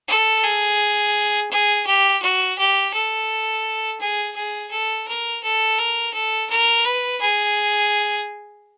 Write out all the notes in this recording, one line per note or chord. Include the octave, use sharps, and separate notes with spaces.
A4
G#4
G#4
G4
F#4
G4
A4
G#4
G#4
A4
A#4
A4
A#4
A4
A#4
B4
G#4